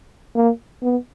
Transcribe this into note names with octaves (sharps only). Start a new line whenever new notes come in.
A#3
B3